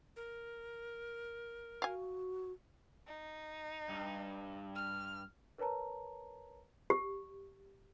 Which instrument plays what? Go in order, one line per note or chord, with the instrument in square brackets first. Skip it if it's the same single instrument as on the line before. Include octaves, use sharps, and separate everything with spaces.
[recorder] A#4
[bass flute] F#4 [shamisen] F5 G#5
[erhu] D#4
[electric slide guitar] G2
[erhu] F6
[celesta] A#4 B4 C#5 A5 A#5
[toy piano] G4